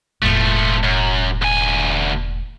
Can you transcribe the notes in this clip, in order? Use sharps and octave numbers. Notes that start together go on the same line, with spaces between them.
E1 A2 F3 A3
F#2
D2 G#5